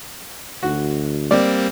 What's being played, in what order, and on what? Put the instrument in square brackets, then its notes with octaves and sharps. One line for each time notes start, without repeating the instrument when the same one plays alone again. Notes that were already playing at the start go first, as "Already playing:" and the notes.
[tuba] D2 [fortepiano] F#4
[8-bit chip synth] G3 A#3 C4 [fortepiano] D5